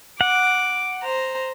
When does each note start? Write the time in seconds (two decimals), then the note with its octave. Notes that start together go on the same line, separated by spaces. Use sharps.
0.21 F#5 D6
1.03 C5 A#5